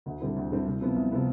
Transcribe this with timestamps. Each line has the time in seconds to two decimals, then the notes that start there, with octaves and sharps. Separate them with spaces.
0.06 D2
0.20 D3 G3 C4 E4
0.36 D2
0.51 D3 G3 C4 E4
0.66 C2
0.81 C3 F3 B3
0.96 C2
1.12 C3 F3 B3